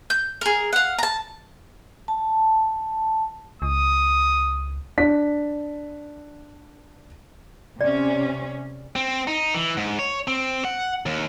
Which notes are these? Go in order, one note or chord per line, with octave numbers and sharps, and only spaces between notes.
G6
G#4 A#4
F5 F#5
A5 A#5
A5
C#2 D#6
D4 B6
C3 C#4 D5
C4
D#4
E3
G#2
C#5
C4
F#5
D#2